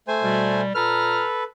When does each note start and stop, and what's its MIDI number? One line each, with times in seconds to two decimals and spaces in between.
0.08 0.61 57
0.08 0.61 72
0.08 0.61 80
0.22 0.70 47
0.22 0.70 55
0.75 1.25 46
0.75 1.44 69
0.75 1.44 71
0.75 1.25 82
0.75 1.25 89